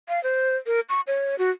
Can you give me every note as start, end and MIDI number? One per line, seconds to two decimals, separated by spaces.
0.09 0.22 77
0.23 0.56 72
0.66 0.80 70
0.89 1.01 85
1.07 1.36 73
1.39 1.51 66